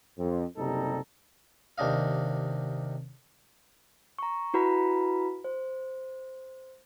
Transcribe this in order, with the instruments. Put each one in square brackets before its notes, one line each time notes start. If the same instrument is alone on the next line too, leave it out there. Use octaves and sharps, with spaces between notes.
[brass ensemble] F2
F#1 C3 G3 D#4 A4 A#5
[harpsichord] D#2 C3 D4 D#5 F5
[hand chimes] A#5 C#6
E4 F#4 B4 A#5 B5 B6
C5